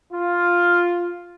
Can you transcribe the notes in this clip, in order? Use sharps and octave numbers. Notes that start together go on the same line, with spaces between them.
F4